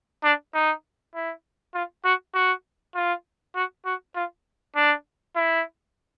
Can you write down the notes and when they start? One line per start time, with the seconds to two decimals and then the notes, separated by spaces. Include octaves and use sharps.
0.24 D4
0.54 D#4
1.15 E4
1.74 F4
2.04 F#4
2.34 F#4
2.95 F4
3.55 F#4
3.85 F#4
4.15 F4
4.76 D4
5.36 E4